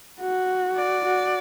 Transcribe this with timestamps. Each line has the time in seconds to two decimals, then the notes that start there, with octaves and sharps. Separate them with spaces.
0.20 F#4
0.77 D5
1.06 F#4